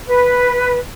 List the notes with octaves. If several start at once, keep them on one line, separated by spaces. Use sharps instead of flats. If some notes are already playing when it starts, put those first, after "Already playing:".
B4